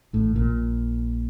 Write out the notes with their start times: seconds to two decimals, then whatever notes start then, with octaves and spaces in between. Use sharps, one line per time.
0.13 A1 A2
0.36 A#1 A#2